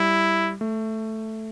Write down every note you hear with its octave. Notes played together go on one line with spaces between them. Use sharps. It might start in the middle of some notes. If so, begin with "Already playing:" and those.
Already playing: G3 E4
A3